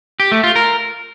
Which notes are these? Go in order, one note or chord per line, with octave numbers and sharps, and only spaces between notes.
G4
A3
F4
A#4